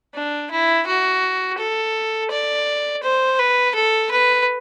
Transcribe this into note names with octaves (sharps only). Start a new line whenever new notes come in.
D4
E4
F#4
A4
D5
C5
B4
A4
B4